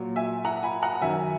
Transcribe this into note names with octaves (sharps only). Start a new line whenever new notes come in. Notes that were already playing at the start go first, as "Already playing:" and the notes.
Already playing: A#2 F#3
E5 G#5
F#5 A#5
G#5 B5
F#5 A#5
F#2 D#3 F#3 E5 G#5